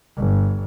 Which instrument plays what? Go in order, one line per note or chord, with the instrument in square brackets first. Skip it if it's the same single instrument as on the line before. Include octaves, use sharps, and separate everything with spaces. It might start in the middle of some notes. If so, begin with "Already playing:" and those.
[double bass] G1